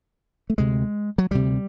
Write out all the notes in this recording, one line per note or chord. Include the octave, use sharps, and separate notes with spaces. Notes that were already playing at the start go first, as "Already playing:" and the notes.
A3
D2 C3 G#3
F#3
D2 C3 G3